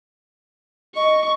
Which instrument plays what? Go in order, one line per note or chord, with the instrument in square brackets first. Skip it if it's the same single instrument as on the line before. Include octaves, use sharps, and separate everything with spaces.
[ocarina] D#5 [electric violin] C#6